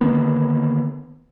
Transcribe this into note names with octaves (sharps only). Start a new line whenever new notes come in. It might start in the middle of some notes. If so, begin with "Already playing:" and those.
D3 D#3 A#3 B3